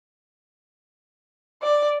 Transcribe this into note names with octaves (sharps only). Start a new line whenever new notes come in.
D5